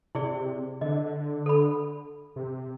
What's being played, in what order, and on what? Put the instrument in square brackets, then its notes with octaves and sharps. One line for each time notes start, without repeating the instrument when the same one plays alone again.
[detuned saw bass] C3 [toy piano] E4 G#4 D5
[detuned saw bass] D3 [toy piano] D#5
[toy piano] A4 B5
[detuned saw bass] C3